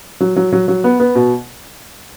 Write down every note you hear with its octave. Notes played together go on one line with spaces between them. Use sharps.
F#3
F#3
F#3
F#3
B3
B3
B2